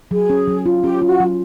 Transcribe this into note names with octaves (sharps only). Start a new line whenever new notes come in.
F#3 G#4
C#4
F#3
F4
C#4 G4
F4
F#4
F#3